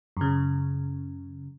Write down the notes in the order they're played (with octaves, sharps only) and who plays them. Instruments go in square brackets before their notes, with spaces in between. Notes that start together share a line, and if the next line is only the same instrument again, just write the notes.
[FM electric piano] F#2 C#3